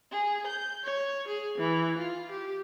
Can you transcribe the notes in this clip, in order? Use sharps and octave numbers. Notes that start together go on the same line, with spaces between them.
G#4
G6
C#5
G#4
E3
F4
G4